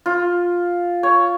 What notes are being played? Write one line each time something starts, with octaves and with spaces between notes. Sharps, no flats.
F4
C#5